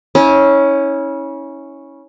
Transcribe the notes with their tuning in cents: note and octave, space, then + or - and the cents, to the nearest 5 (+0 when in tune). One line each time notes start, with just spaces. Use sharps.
C#4 +0 E4 -35